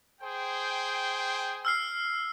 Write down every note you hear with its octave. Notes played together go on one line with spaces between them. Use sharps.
G#4 C5 G5
E6 F6 C7